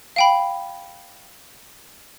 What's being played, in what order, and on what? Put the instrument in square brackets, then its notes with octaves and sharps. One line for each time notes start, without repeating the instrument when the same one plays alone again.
[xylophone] F5 G5 B5